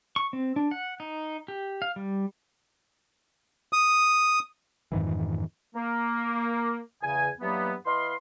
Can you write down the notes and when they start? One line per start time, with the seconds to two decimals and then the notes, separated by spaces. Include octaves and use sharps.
0.16 C#6
0.33 C4
0.56 D4
0.71 F#5
1.00 D#4
1.48 G4
1.82 F5
1.96 G3
3.73 D#6
4.92 F2 G#2 D#3 E3
5.75 A#3
7.02 E2 C#3 G#5
7.40 G2 E3 F#3 A#3 B3
7.86 E3 D#5 F5 B5 C6